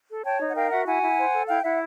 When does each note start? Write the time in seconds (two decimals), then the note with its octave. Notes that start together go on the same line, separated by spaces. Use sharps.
0.09 A4
0.24 C#5 G5 A5
0.40 D#4
0.48 F#5
0.55 A#4 F5 G5
0.71 F#4 E5 F#5
0.86 E4 F#5 G#5
1.02 E4
1.18 C5
1.33 A4
1.48 E4 F5 G5
1.64 E4 E5 F#5